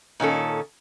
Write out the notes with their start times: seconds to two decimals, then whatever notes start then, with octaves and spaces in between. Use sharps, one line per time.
0.20 A#2 D#3 C#4 A4